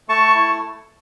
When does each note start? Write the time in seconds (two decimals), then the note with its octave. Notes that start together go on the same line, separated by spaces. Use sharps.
0.09 A3 A5 C#6
0.35 E4